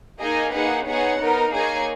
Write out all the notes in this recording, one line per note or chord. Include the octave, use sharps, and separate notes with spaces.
A#3 D#4 G#4 D#5 G#5
A#3 D#4 G#4 B4 F#5
B3 D#4 G#4 C#5 F#5
B3 D#4 A#4
A#3 D#4 G#4 C#5 G#5